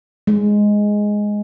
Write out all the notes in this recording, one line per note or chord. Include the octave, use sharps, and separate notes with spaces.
G#3